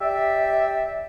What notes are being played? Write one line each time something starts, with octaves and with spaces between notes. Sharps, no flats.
G4 D5 E5